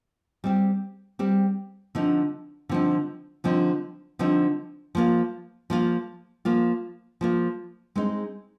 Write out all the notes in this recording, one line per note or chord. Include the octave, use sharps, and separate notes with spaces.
G3 C4 G4
G3 C4 G4
D3 F3 C4 D#4
D3 F3 C4 D#4
D3 F3 C4 D#4
D3 F3 C4 D#4
F3 A#3 F4
F3 A#3 F4
F3 A#3 F4
F3 A#3 F4
G#3 C4 D#4